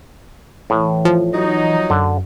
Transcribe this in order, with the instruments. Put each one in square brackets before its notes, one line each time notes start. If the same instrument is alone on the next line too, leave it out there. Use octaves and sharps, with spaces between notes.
[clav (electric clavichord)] A2 [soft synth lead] E3
[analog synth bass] F3
[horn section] F#3 D#4
[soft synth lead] F#2 [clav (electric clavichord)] D3